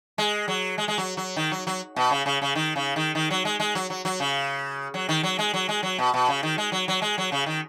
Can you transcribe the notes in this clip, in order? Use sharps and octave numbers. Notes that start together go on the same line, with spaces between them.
G#3
F#3
G#3
G#3
F#3
F#3
D#3
F#3
F#3
B2
C#3
C#3
C#3
D#3
C#3
D#3
D#3
F#3
G#3
G#3
F#3
F#3
F#3
C#3
F#3
D#3
F#3
G#3
F#3
G#3
F#3
B2
B2
C#3
D#3
G#3
F#3
F#3
G#3
F#3
C#3
D#3